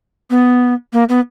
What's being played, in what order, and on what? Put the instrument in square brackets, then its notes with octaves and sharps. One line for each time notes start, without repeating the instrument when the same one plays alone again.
[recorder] B3
A#3
B3